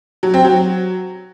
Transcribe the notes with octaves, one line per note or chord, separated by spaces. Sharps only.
F#3
C4
F#3